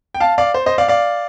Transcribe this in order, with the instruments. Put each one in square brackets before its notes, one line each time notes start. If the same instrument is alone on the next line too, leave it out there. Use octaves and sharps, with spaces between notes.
[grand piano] G5
F5 A5
D5 F5
C5
C5 D#5
D5 F5
D5 F5